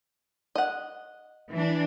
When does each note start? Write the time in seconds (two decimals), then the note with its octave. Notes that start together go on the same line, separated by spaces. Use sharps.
0.55 D#5 F#5
1.52 E3 D4